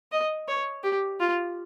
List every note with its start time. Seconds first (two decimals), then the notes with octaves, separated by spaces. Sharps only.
0.12 D#5
0.48 C#5
0.84 G4
1.20 F4